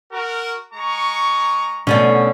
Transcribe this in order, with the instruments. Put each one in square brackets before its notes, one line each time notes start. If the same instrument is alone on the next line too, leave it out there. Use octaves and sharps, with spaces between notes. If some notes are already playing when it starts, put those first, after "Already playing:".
[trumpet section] F#4 A#4
G#3 A#5 C#6
[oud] B2 D3 A3 [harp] C#4